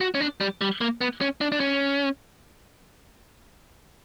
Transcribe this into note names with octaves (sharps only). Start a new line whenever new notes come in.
F#4
C#4
D4
G3
G3
A#3
B3
C#4
D4
D4
C#4